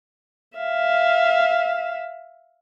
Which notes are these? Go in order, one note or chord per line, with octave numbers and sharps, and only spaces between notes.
E5 F5